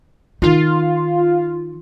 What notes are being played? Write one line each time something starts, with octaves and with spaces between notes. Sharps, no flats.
D#3 D#4 F4